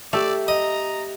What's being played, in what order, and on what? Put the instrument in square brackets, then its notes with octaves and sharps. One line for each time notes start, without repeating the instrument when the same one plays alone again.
[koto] A3 [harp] G4 E5 [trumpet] D5
[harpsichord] D#5 [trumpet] A#5